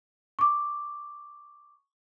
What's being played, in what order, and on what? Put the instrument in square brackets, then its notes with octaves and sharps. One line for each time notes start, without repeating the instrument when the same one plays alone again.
[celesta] C#6 D6